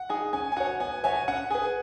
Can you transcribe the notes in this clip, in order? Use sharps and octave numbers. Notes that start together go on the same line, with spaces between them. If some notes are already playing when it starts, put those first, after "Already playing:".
Already playing: F#5
D#4 G#4
C#4 G#5
G#5
F#4 C#5 F#5
B3 G#5
F#4 C#5 E5 G#5
C#4 F#5
G#4 B4 G#5